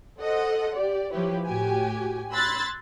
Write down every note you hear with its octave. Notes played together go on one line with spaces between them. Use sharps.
A4 C5 D#5 F#5
G4 D5
F3 E4 G4 B4 C#5
A2 F#4 G4 G#5
B5 C6 E6 F#6 G#6 A6